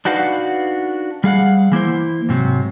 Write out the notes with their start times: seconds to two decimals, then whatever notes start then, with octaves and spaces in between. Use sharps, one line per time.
0.05 D4 D#4 F#4 B4 F5
1.24 G3 G#4 F5 F#5
1.72 E3 A#3 E4 C5
2.29 G#2 C3 F#3